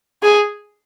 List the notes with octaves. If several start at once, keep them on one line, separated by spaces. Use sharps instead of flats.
G#4